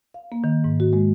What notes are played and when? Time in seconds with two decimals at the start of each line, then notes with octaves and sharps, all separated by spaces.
0.14 F5
0.32 A#3
0.44 D#3
0.64 G#2
0.80 F#4
0.93 G#3